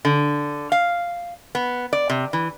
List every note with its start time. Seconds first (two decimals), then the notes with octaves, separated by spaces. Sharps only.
0.05 D3
0.72 F5
1.55 B3
1.93 D5
2.10 C3
2.33 E3